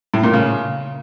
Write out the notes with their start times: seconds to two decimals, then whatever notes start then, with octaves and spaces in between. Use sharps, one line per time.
0.14 A2
0.24 A#2
0.33 C#3